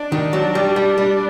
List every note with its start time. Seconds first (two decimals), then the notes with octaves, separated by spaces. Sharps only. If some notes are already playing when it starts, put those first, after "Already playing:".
Already playing: D4
0.12 D#3
0.33 F#3
0.55 G3
0.76 G3
0.98 G3